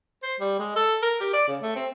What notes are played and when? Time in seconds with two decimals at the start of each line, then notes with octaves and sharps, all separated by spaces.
0.23 C5
0.40 G3
0.59 G#3
0.76 A4
1.03 A#4
1.21 G4
1.33 D5
1.48 C#3
1.62 A3
1.76 C4